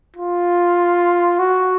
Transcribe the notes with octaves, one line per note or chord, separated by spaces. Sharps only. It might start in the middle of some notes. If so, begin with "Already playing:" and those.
F4
F#4